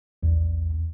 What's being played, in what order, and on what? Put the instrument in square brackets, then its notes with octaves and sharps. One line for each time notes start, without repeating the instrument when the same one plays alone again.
[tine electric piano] A#1 E2